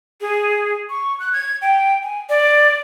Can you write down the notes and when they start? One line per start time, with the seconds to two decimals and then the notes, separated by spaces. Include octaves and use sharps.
0.21 G#4
0.90 C#6
1.20 F#6
1.33 G#6
1.62 G5
2.03 G#5
2.29 D5